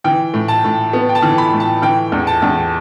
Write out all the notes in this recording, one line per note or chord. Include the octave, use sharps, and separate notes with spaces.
E3 G5
A2
A5
A2
B3
G5
A5
E3
B5
A2
A5
E3 G5
E2
A5
E2